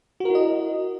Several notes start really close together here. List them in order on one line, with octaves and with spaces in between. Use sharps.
F#4 A#4 E4 D#5